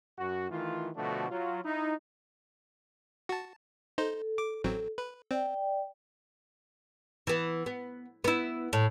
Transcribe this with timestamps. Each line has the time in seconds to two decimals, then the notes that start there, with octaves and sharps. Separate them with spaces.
0.18 F#2 F#4
0.50 D#3 E3 A3 F4
0.96 B2 D3 F3 A3 D4 F#4
1.30 F#3 F4
1.64 D#4 E4
3.29 F#4 A5
3.98 D#4 A4 C5
4.38 D6
4.64 A1 F#3 C4
4.98 B4
5.31 C4 D5 G5
7.27 E3 B3
7.66 B3
8.24 B3 E4
8.73 A2